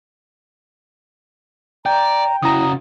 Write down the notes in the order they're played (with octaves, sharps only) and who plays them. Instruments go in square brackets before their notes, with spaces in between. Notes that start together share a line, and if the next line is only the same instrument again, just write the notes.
[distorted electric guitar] D5 [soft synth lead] G5 [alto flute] A#5
[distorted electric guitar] C#3 F#4 [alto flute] E4 [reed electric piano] A#5 D#6